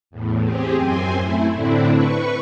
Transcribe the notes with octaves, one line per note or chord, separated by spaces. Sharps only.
E2 A2
C4 G4 G#4
F#2 C4 C5 G#5
A3 E4
A2 D3 C4 D4 E4
B4 C#6